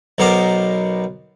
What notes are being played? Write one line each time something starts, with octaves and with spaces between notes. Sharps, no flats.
B1 B2 B3 A#4 C5 D6